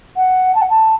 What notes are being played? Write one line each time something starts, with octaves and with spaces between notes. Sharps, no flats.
F#5
A5
F#5
A5